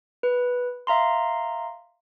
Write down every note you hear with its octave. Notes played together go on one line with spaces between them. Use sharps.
B4
E5 F5 A#5 C6